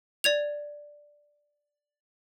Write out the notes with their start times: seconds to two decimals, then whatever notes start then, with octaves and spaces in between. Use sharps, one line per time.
0.24 D5 G#6 F7